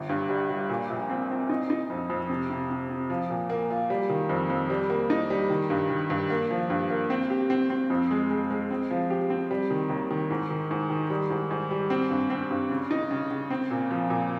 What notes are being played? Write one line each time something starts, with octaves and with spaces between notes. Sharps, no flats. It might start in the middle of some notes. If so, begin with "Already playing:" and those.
Already playing: G1
G2
G3
G3
A#2
A#1
C4
C4
D#4
D#4
F2
F2
C3
C3
C3
C3
F3
A#2
A#3
F4
G3
D#3
F2
F2
G3
A#3
D#4
G3
D#3
G2
D#3
G2
A#3
F3
G2
A#3
C4
G4
C4
C4
F2
G#3
G#3
G#3
C4
F3
G4
C4
G3
D#3
D#2
D#3
G#2
D#3
G#2
D#3
G3
G#2
G#2
G3
C4
G2
C4
G2
C#3
D#4
C#3
C#3
C4
A#2
F3
A#2